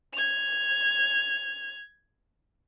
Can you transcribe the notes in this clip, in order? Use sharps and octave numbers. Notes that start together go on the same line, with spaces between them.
G#6 F7